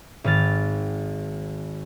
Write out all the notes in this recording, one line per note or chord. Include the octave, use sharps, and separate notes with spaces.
G#1 D#3 F6 A6